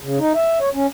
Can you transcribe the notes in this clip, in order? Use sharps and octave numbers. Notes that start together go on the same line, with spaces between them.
C#3
D#4
E5
C#5
C#4